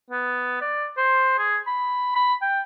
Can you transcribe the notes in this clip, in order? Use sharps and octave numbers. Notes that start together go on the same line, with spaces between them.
B3
D5
C5
G#4
B5
B5
G5